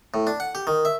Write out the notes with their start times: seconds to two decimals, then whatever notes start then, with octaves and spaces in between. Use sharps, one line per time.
0.14 A2
0.27 D4
0.40 F#5
0.55 G4
0.67 D#3
0.85 E5